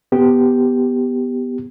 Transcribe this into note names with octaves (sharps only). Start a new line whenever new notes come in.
B3 G4